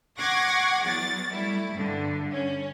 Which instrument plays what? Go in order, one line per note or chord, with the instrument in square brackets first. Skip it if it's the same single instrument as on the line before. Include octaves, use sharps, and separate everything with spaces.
[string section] F#5 C#6 D6 G#6 A#6 C7
E2 F#3 A6
G3 A3 E4
G2 D3
C#4